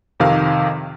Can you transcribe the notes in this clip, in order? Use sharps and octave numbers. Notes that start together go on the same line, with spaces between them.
F2 C3 D#3 F5